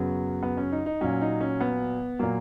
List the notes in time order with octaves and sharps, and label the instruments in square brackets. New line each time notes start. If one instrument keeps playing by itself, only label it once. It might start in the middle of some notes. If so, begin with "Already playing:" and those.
Already playing: [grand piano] F#2 C#3 F#3 B3
B3
C#4
D#4
D#4
A#2 F#3 C#4
D#4
C#4
B3
A#2 F#3 A#3